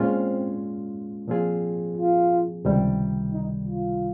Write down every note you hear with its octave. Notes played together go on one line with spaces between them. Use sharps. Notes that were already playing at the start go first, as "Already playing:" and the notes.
Already playing: A#2 G#3 C4 C#4 F4
A#2 F3 C4 F4 G#4
F4
C#2 C3 D#3 G3
D#4
F4